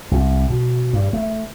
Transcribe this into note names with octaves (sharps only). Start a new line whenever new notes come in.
C2
B2
G2
A3